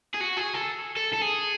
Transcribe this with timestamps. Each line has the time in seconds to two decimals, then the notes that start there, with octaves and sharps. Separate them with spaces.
0.14 G#4
0.21 F#4
0.37 G#4
0.54 A4
0.96 A4
1.13 A4
1.21 G#4